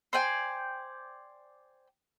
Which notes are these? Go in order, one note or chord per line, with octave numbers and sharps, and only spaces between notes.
C5 D5 G5 G#5